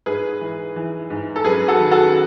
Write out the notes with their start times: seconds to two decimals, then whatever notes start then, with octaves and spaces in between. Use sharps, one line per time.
0.06 G#2 G#4 B4
0.41 E3
0.76 E3
1.10 G#2
1.36 A4
1.45 F#2 G#4 B4
1.68 F#4 A4
1.80 D#3
1.91 F#4 A4